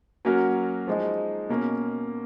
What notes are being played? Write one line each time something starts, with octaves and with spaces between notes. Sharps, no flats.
F#3 A#3 C#4 F#4 A#4
F3 G#3 D#4
B2 A#3 C#4